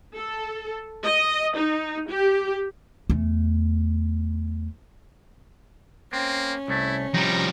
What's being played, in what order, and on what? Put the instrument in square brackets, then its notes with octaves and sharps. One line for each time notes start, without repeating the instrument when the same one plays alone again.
[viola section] A4
D#5
D#4
G4
[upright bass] E2 A3
[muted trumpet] A#3 [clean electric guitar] C4 [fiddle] C#4
[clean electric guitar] C2 A3 [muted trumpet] E4
[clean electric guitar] C3 D#4 [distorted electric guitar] F3 G3 [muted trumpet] A#5